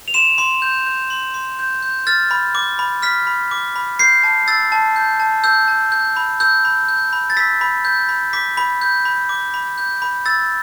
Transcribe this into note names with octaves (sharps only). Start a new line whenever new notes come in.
F7
C6 E7
C6
G6
G6
C6
C6
G6
G6
F6 A6
B5
D6
B5
F6 B6
B5
D6
B5
G6 C7
A5
E6 A6
A5
G6
A5
E6 G6
A5
G6
B5
E6 G6
B5
G6
B5
A6
E6 B6
B5
G6
B5
D6 B6
B5
G6
B5
D6
B5
G6
B5
E6 A6